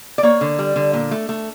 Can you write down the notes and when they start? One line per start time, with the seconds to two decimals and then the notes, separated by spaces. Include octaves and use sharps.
0.18 D5
0.23 A#3 C#5
0.41 D3
0.59 G3
0.76 D3
0.93 A#2
1.11 A3
1.29 A3